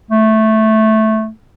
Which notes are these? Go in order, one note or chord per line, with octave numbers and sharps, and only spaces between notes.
A3